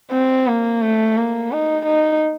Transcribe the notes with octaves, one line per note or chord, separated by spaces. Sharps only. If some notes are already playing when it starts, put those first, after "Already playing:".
C4
A#3
A3
A#3
D#4
D#4